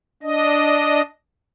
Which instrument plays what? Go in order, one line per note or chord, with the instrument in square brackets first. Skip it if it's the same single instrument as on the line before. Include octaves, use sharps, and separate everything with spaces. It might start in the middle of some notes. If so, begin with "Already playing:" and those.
[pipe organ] D4 D#5